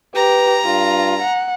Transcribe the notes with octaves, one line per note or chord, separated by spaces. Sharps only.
G4 B4 A#5
G2 F4
F#5